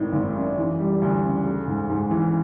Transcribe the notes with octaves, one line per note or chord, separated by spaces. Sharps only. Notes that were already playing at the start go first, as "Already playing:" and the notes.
Already playing: G#1 A2 D#3
G#1
F#2
E3
G3
D2
C#3
A3
G#2
G#2
E3